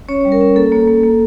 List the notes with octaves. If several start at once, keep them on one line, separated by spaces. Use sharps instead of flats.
C#4 C#5
G3
A#4
C#4
A#3 A4
A#3
A#3
A#3